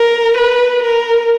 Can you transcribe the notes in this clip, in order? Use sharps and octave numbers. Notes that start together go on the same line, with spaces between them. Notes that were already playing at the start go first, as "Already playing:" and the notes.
Already playing: A#4
B4
A#4